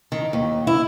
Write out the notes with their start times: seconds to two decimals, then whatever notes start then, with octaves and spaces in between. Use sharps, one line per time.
0.12 D#3
0.33 D#2
0.67 E4